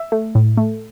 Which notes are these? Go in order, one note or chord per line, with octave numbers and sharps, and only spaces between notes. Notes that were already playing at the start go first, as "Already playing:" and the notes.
Already playing: E5
A3
A2
A3